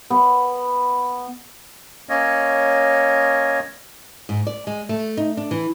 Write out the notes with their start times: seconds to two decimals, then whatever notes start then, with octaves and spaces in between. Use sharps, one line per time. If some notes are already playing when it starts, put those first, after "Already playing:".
0.10 B3
2.09 A#3 C#4 C#5 D#5
4.29 G#2
4.47 D5
4.67 G#3
4.89 A3
5.17 D#4
5.37 D4
5.51 E3